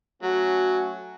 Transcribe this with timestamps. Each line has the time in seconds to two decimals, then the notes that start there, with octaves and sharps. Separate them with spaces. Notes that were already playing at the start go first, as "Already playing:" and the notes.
0.23 F#3 A3 C#4 F#4